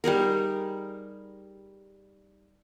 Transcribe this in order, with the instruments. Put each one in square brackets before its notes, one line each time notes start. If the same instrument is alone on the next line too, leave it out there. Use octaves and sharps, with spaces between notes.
[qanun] G3 D#4 G#4 A#4